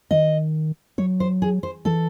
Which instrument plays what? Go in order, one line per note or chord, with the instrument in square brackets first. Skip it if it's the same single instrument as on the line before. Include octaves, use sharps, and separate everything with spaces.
[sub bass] D#3 [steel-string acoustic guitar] D#5
[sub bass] F#3 [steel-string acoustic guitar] C#5
[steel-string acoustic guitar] C5
G#4
C5
[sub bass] E3 [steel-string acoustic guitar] A4